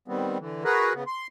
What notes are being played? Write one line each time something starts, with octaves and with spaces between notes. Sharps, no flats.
D#3 G3 B3 C4
D3 E3
F#4 G#4 A#4 B4
C#3 B3
C6